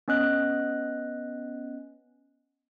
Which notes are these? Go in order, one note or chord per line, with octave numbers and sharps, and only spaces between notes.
B3 C#4 D#5 F#6